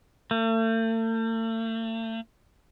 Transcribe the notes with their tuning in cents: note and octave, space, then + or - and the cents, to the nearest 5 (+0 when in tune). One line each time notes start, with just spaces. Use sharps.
A3 +40